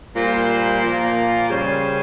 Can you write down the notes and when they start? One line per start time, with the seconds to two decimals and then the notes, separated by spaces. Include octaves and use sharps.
0.14 A#2 G3 A#3 F4 C5
0.82 A#2 F3 A#3 F4
1.50 C#3 G3 C#4 G#4 C5